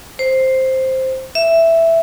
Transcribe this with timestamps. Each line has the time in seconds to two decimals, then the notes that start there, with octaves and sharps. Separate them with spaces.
0.19 C5
1.35 E5